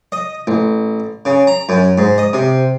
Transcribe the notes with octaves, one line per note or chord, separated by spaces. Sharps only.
D#5
A1
C#3
A#5
F#2
G#2
D#5
C3